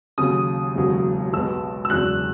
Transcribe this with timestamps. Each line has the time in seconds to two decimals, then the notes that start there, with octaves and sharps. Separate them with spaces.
0.18 D#2 C#3 F#3 D#6
0.75 E1 D#2 C#3 F#3
1.33 B1 B2 G#3 B3 E6
1.85 E6
1.90 E1 E2 C#3 F#3 F#6